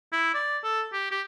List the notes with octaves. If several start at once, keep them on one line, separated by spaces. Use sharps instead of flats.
E4
D5
A4
G4
G4